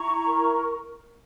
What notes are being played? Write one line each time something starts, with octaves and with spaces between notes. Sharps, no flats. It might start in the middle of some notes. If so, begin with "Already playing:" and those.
Already playing: E4 A#5 C#6
A#4